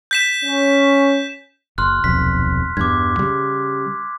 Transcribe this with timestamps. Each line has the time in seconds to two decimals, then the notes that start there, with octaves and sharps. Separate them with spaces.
0.11 G6 B6 E7
0.44 C#4
1.78 F#1 C6 F6 F#6
2.04 D#1 B1 F2 B6
2.77 E2 G2 D6 G#6
3.19 C#3 G3